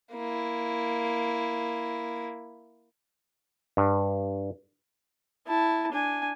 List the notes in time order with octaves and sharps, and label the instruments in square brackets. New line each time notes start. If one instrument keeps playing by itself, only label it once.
[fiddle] A#3 E4
[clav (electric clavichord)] G2
[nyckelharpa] E4 A5
D4 G#5